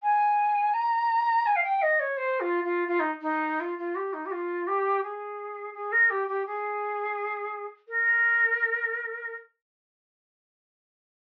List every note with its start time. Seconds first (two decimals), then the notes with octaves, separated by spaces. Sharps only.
0.03 G#5
0.74 A#5
1.46 G#5
1.56 F5
1.64 G5
1.82 D#5
2.00 C#5
2.17 C5
2.40 F4
2.64 F4
2.88 F4
3.00 D#4
3.21 D#4
3.60 F4
3.78 F4
3.95 G4
4.13 D#4
4.26 G4
4.32 F4
4.67 G4
5.03 G#4
5.74 G#4
5.92 A#4
6.10 G4
6.28 G4
6.46 G#4
7.88 A#4